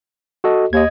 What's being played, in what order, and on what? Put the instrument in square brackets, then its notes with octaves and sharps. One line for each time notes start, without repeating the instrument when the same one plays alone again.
[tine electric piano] F#4 A4 D#5
[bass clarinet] D#2 [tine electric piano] D#5 G#6